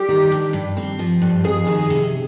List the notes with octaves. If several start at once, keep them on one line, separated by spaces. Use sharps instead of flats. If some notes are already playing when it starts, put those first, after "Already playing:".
Already playing: G3 G4
D#3
G2
G2
C4
F3
G2
F2 G#4
D#3
C3